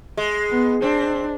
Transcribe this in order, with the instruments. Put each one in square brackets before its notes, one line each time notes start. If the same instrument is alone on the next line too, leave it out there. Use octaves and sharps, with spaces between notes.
[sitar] G#3
[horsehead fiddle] B3
[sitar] C4 [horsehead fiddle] D4